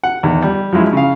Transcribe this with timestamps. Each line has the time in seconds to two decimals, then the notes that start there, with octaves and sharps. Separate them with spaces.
0.04 F#5
0.23 E2 D#3
0.42 G3
0.73 F3 F#3 G#3 E4
0.93 C#3 F5